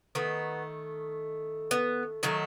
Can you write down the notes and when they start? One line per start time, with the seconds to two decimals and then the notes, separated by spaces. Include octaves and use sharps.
0.15 D#3 A3 B3
1.71 B3
2.23 D#3 F#3 A3